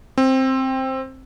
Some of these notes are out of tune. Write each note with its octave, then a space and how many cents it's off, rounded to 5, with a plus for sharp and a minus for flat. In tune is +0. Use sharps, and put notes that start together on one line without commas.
C4 +10